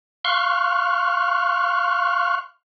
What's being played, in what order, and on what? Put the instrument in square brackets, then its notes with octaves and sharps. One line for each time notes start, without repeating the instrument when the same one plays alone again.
[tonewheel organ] F5 C6 C#6 F6 F#6